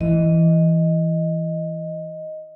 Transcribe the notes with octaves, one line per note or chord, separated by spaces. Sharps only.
E3 D#5